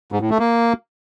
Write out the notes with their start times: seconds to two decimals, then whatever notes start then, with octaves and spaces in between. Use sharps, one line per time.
0.12 G#2
0.21 A2
0.30 A3
0.39 A#3